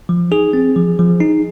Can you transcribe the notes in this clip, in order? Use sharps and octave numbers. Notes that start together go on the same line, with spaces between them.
F3
D#4 G#4
C4
F3
F3
D#4